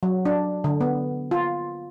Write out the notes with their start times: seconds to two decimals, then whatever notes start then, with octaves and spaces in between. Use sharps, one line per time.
0.03 F#3
0.25 D4
0.64 D3
0.81 B3
1.31 F4